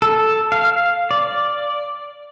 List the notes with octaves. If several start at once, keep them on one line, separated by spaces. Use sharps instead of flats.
A4
F5
D5